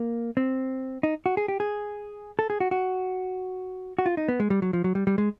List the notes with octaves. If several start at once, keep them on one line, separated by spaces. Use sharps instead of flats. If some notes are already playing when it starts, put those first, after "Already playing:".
Already playing: A#3
C4
D#4
F#4
G#4
G4
G#4
A4
G#4
F#4
F#4
F#4
F4
D#4
B3
G#3
G3
F#3
F3
F#3
G3
G3
G#3